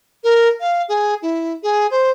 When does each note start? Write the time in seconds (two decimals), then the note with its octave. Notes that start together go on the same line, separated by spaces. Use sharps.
0.24 A#4
0.60 F5
0.89 G#4
1.22 E4
1.63 G#4
1.91 C5